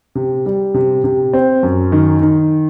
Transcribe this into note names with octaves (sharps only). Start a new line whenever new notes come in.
C3
G3
C3
C3
C4
F#2
D#3
D#3